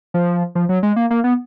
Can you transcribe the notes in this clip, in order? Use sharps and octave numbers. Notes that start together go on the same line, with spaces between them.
F3
F3
F#3
G#3
A#3
A#3
B3